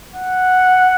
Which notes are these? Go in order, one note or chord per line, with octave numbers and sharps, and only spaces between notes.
F#5